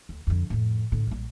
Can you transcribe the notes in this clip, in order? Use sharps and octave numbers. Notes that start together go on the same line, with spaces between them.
D2
F2 D3
F2 A2
A2 D3
A#1 G3